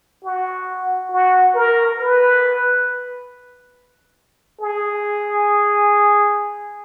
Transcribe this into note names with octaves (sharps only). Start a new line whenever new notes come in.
F#4
F#4
A#4
B4
G#4